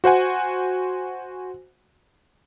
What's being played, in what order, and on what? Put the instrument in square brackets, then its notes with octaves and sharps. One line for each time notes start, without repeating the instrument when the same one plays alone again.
[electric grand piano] F#4 C5 F#5 G#5